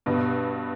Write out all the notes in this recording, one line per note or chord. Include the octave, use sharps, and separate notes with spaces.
G2 B2